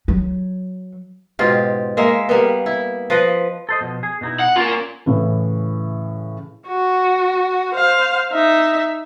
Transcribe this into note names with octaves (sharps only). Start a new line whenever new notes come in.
F#3
G#2 B2 F4 G4
G#3 A#3 E5
G3 A#3 B3
E4
F3 B4 D#5
A4 C5 D#5
B2 F3
G#4
B2 D#4 E4
F#5
A#3 C#4 F4 A#4 G#5
A2 C#3 E3
F#4
C5 F5
D#4 E5